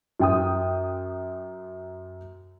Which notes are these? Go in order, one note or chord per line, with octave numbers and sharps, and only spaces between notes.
F#2 G5 D#6